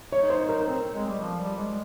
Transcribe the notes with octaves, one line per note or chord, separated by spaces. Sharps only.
D#4 C#5
C5
A#4
C4
G#3
G3
F3
G3
G#3